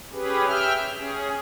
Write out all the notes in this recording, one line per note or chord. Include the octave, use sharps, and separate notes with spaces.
C#4 G4 G#4 B4
E5 G5 F6
C#4 G#4